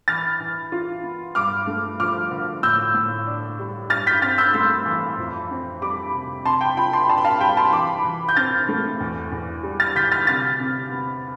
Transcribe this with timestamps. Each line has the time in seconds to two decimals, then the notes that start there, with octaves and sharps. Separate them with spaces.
0.08 E3 F6 A6
0.40 E3
0.72 F4
1.04 B3
1.35 G2 D6 F6
1.67 A3
1.99 F3 D6 F6
2.31 D3
2.63 A2 E6 G6
2.94 A2
3.27 D4
3.59 G3
3.90 G2 F6 A6
4.07 G6 B6
4.22 C4 F6 A6
4.38 E6 G6
4.54 A3 C6 E6
4.86 E3
5.18 F2
5.50 C4
5.82 G3 B5 D6
6.13 C3
6.45 C3 A5 C6
6.61 G5 B5
6.77 F4 G5 B5
6.93 A5 C6
7.09 D4 A5 C6
7.18 B5
7.25 F5 A5
7.40 G3 G5 B5
7.57 A5 C6
7.72 E3 B5 D6
8.04 E3
8.29 G6
8.36 C4 F6 A6
8.69 A3
9.00 E2
9.32 E2
9.63 G3
9.80 F6 A6
9.95 D3 G6 B6
10.12 F6 A6
10.27 C3 F6 A6
10.60 C3
10.91 B3